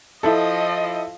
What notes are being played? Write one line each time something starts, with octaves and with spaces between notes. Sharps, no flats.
F3 E4 A4 D#5